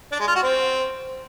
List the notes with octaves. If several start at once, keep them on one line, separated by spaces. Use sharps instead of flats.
D4
G#3
F4
F#4
C4